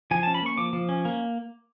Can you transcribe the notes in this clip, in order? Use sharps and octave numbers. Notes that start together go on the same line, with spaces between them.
F3 G#5
C#4 A5
B5
A#3 C#6
F3 D6
F3
C#4
A#3